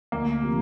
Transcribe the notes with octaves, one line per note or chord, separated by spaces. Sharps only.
D2 A#3
C3 F3